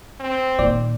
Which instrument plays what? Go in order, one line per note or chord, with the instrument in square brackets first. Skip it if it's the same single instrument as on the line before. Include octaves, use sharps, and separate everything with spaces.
[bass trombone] C4
[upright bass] A#2 D#3 [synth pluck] D5